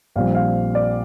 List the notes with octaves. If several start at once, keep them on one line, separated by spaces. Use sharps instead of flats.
A#1 A#2 G3 C4 F5
F5
D5